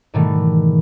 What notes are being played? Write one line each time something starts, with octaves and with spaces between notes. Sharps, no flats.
G#2 B2 D#3 E3 G3 A3